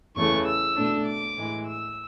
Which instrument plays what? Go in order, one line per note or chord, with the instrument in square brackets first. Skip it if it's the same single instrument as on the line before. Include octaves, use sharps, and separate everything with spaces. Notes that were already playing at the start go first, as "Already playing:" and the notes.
[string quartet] E2 C#3 E3 A3 C#6
E6
B2 A3 D4
D6
A2 E3 G#3
E6